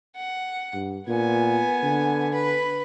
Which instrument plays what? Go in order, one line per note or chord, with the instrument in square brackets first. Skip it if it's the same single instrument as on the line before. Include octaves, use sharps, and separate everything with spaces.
[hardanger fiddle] F#5
[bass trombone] G2
[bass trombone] A#2 [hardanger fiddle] B3 G#5
[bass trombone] D3
[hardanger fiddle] B4 B5